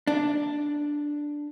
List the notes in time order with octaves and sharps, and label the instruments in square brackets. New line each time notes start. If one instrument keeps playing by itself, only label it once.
[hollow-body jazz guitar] D4